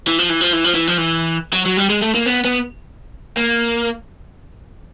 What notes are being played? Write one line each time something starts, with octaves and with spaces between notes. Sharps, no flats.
E3
F3
E3
F3
E3
F3
E3
F3
E3
F#3
F#3
G3
G#3
A3
A#3
B3
B3
A#3